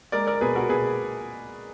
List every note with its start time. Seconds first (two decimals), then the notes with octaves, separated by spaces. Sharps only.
0.12 G#3 A#4 D5
0.27 A#4 D5
0.41 B2 G#4 B4
0.55 F#4 A#4
0.69 B2 G#4 B4